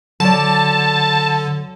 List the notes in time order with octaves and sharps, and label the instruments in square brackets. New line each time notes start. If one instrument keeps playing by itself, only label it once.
[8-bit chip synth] D3 [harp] F#3 D5 [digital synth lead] A5